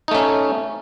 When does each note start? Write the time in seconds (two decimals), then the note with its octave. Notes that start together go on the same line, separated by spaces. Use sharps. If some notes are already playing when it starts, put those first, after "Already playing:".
0.08 D#4
0.11 A3
0.14 C#4